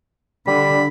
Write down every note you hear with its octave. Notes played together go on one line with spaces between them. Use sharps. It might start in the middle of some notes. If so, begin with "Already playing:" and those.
D3 G3 B5